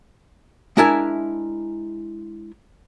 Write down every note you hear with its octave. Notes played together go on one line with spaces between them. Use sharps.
G#3 D4 E4 A#4 E5 G#5